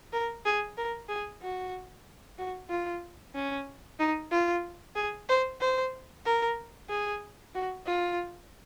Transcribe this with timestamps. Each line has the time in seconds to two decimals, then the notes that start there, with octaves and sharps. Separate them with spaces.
0.13 A#4
0.45 G#4
0.77 A#4
1.09 G#4
1.42 F#4
2.39 F#4
2.70 F4
3.35 C#4
4.00 D#4
4.31 F4
4.95 G#4
5.29 C5
5.61 C5
6.25 A#4
6.90 G#4
7.54 F#4
7.86 F4